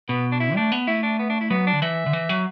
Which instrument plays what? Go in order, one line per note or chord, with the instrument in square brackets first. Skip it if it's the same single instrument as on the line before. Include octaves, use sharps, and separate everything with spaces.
[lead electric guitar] B2 [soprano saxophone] B3
[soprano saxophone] D4
E4
[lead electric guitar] A3 [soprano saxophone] D4
[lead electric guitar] B3
[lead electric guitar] A3 [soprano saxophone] E4
[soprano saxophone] D4
B3
D4
E4
[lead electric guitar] F#3 [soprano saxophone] B3
[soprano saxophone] D4
[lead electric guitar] D3
[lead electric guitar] E3 [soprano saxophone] E5
[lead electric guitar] D3
E3
F#3